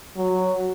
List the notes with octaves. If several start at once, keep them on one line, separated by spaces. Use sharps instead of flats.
F#3